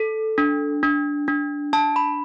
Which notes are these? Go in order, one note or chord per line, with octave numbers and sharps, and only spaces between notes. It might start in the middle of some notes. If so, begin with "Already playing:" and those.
Already playing: A4
D4
D4
D4
D4 A5
B5